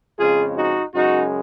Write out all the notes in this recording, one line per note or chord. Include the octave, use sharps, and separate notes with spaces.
F2 C#3 F3 G#3 F4 G#4
D#4 F#4
F#2 C#3 G#3 D#4 F#4